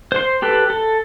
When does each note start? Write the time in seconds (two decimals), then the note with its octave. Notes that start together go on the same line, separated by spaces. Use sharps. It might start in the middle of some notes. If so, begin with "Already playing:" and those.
0.12 C5 C6
0.42 G4 A4 B4
0.70 A4